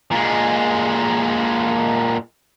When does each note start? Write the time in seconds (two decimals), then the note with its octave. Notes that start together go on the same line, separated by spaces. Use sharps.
0.11 A#2 G#3